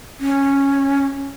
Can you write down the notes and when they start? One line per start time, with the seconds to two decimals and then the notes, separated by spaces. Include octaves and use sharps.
0.20 C#4